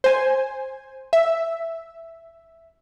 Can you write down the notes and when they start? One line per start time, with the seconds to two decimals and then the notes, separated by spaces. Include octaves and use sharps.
0.04 C5 G#5
1.13 E5